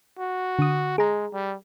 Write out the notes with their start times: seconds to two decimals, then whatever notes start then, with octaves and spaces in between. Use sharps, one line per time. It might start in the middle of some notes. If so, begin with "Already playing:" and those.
0.18 F#4
0.59 D3 D#6
0.98 G#3 G#4 A#5
1.33 G3